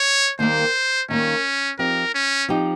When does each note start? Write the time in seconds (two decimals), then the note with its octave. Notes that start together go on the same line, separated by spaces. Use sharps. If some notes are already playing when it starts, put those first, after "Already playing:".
Already playing: C#5
0.39 D#2 D#3 G3 A#3 C5
1.09 D#2 D#3 G3 A#3 C#4
1.79 F3 C4 D#4 G4 A#4
2.14 C#4
2.48 F3 C4 D#4 G4